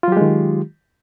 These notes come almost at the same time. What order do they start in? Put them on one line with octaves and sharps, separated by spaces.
F4 F#3 G4 G#3 D#3